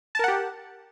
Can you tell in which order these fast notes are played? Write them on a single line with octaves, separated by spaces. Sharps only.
A5 A#4 F#5 G4